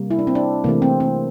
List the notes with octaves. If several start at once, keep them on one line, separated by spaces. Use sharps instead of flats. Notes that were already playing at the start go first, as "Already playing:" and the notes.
Already playing: C3 G3 A#3
E4
D4
C4
D4
C3 E3 A3 A#3
C4
C4